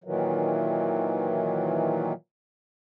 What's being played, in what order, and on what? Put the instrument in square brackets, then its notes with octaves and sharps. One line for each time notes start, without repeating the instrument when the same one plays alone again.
[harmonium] A#2 D#3 E3 F#3